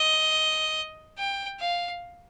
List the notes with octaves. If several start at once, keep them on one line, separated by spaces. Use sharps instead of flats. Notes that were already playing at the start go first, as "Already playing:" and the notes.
Already playing: D#5
G5
F5